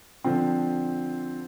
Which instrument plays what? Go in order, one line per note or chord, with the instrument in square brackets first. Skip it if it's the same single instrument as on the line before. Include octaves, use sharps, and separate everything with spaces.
[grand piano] D3 F3 C4